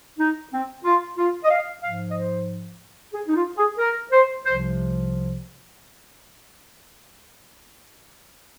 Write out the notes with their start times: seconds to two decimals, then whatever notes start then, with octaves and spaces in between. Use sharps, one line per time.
0.19 D#4
0.52 C4
0.85 F4
1.17 F4
1.44 D#5
1.50 F5
1.82 G#2 F3 F5
2.10 D#5
2.14 C5
3.13 G#4
3.27 D#4
3.35 F4
3.57 G#4
3.78 A#4
4.11 C5
4.44 C2 C3 F3 C5